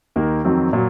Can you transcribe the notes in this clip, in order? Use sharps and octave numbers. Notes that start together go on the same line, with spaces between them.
D#2 D#3 A#3
F2 D#3 F#3 C4
A#2 F#3